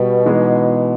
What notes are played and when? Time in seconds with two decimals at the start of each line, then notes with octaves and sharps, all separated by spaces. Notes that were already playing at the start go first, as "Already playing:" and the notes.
Already playing: B2 G3
0.25 E3 G#3 B3 D#4 G#4